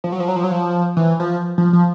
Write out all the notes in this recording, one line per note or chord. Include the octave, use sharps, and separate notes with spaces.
F3
F#3
F3
F#3
F3
F#3
F3
E3
F3
F3
F3